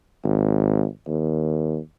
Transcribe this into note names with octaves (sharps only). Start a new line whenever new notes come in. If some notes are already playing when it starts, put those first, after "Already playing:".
G#1
D#2